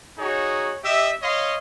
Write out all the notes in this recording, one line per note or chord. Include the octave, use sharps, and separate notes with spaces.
D#4 F#4 G#4 C#5
G4 D#5 E5
C#5 D#5 F5 C6